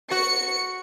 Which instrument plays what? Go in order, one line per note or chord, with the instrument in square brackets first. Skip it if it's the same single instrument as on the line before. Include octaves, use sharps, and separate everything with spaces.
[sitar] F#4 [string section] C#7